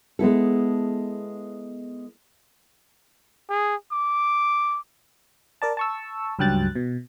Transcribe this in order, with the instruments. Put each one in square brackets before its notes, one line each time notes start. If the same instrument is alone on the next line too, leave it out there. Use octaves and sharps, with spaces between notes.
[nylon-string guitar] G#3 B3 E4 A4
[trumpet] G#4
D6
[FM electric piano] A#4 D5 A5
A5 C#6 E6
C#2 G2 F#3 G5 F#6 A6
B2